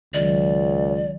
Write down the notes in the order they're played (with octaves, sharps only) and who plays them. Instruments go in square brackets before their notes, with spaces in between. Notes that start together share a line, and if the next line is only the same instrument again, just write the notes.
[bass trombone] C#2 [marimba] D#3 F#3 [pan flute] D5